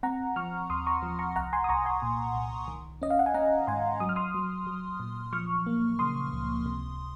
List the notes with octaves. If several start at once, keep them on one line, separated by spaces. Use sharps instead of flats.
C4 F#5 A#5
F3 C#6 F6
D#2 C6 D#6
A#5 C#6
F3
A#5 C#6
C2 F#5 A#5
G#5 C6
D#6
C2 A#5 C#6
G#5 C6
A#2
C2
D#3
C#4 D#5
F5
F#5
G#5
C#4 F#5 A#5
G#2 G#5 C6
F#3 D#6
F6
C6 D#6
F#3
F#3
A#2
F3 C#6 F6
A#3
C#3 C6 D#6
C#2
C3